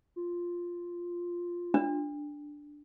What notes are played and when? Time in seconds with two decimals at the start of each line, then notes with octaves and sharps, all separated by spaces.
0.16 F4
1.74 D4